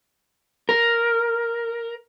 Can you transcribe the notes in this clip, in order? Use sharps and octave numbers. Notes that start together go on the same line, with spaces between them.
A#4